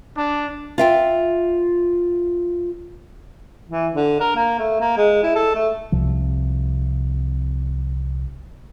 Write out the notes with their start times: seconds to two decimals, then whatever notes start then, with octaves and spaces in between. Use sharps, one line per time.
0.17 D4
0.78 F4 E5 G5
3.69 E3
3.95 D3
4.20 A#4
4.36 A#3
4.59 A3
4.81 A#3
4.97 G#3
5.23 E4
5.35 A4
5.55 A3
5.92 C2 C3 F3